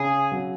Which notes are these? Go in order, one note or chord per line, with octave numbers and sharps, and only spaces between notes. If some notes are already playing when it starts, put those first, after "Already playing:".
Already playing: C#3 G#4
F#3